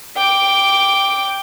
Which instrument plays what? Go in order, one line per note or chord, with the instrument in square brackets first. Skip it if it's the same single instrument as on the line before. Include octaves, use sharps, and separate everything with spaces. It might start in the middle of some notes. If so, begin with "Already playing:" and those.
[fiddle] G5 D6